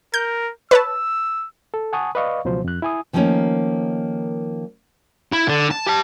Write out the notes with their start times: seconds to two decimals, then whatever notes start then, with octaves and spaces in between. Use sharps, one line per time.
0.14 A#4 G6
0.71 B4 C#5 A5 E6
1.74 A4
1.93 F#5 G#5 A5 C#6 D#6
2.15 B4 D5 D#5 F5 C#6
2.45 C#2 B2 F3 F#3 C5
2.64 F2 F#6
2.82 E4 G#5 D#6
3.13 D#3 F3 A3 A#3 C#4 D#4
5.32 E4
5.48 D3
5.71 A5
5.86 G4 A5